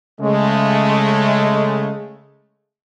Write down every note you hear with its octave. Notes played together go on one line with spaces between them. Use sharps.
C#3 G#3 A3